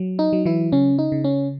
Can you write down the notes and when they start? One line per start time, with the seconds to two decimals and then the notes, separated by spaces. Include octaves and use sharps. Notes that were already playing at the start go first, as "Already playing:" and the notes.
Already playing: F#3
0.19 D#4
0.33 F#3
0.45 E3 E4
0.72 C#3 C#4
0.99 D#4
1.12 C#3
1.24 C#4